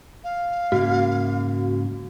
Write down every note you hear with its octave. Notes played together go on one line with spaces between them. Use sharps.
F5
G#2 C#3 A#3 F#4